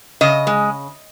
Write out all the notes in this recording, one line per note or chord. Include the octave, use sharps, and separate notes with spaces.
C#3 D#5
G#3